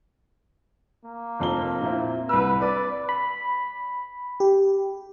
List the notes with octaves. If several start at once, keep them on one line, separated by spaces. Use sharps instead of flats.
A#3
F1 F2 G7
A#2 C4 E4
C2 B4 E6
B4 D5
B5
G4